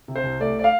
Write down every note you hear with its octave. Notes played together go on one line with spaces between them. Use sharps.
C3
C5
C2
A3 D5
D5
F5